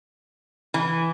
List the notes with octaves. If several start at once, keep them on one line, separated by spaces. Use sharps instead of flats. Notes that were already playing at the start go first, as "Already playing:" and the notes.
E3